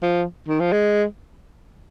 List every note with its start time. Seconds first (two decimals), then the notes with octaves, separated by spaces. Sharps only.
0.02 F3
0.48 D#3
0.60 F3
0.72 G#3